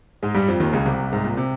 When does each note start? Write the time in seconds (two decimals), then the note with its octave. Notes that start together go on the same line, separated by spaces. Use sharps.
0.23 G#2 G#3
0.34 G2 G3
0.48 F2 F3
0.60 D#2 D#3
0.73 C#2 C#3
0.85 C2 C3
1.13 G#2
1.25 A#2
1.37 C3